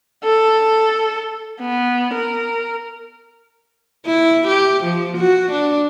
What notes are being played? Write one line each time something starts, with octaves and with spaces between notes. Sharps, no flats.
A4
B3
A#4
E4
G4
F3
F#4
D4